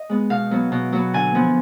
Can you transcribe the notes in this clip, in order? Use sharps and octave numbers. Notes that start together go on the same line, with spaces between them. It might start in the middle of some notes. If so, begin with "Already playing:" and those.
Already playing: D#5
G#3 B3
B2 F5
F#3 B3
B2
F#3 B3
D3 G#5
F3 B3